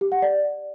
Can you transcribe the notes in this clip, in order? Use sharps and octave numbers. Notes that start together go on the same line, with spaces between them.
G4
F#5
D5